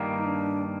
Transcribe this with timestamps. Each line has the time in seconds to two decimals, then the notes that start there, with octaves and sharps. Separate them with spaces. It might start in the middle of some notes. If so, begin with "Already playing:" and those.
Already playing: G2 D#3 G3 A#3
0.17 D#4
0.26 D4